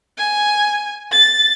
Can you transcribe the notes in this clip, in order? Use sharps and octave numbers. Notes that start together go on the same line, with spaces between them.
G#5
A6